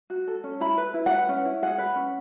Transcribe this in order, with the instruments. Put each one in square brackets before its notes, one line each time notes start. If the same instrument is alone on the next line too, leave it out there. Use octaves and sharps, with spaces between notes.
[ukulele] F#4
A4
C#4
E4 B5
B4
E4
F#5
B4
C#4
E4
G#4 F#5
B4
C#4